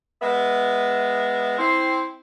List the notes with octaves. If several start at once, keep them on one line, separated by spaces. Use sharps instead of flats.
G#3 B3 E5
C4 E4